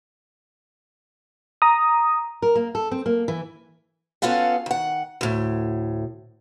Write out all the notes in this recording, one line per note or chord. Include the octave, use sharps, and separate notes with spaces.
A#5 D#6
A#4
A#3
A4
C4
A#3
E3
B3 C#4 F4 A4 F5 F#5
D#3 F#5
D2 A2